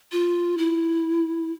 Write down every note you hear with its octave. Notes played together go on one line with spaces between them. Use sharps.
F4
E4